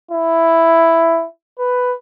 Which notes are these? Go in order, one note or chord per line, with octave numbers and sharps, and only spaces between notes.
E4
B4